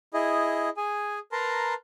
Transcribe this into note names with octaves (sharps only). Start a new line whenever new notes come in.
E4 G#4 D#5
G#4 G#5
A#4 B4 A5 A#5 C6